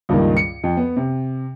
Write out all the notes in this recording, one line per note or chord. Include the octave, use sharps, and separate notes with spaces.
C#2 G2 A#2 D#3
C#7
F2
B3
C3